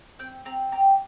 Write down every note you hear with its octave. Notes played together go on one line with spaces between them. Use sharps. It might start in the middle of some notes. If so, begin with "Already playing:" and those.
C4 G5
C4 A#5
G4 A#5